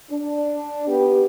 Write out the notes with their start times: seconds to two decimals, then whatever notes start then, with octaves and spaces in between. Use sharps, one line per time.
0.11 D4
0.88 B3 G4